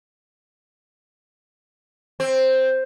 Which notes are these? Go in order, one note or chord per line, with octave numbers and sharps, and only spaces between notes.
C4